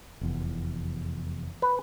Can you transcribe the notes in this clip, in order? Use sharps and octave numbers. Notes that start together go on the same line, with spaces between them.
F1 E2
B4